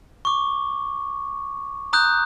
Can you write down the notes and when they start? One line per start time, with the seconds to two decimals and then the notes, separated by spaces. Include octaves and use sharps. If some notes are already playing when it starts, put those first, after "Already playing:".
0.25 C#6 D6
1.93 A#5 D#6 F#6 G6